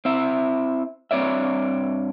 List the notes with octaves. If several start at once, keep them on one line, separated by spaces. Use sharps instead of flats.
C4 E4 E5
G2 C4 C#5 D5 E5